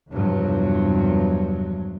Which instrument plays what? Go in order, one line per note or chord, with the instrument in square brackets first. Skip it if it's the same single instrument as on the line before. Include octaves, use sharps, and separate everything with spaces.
[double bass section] E2 G2 C3 F3 F#3